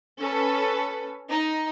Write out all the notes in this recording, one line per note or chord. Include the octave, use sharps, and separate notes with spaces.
C#4 A4 B4
D#4